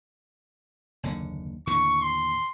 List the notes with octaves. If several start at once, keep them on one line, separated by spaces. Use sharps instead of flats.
F#1 D#2 D3
D#2 A2 D3 C#6
C6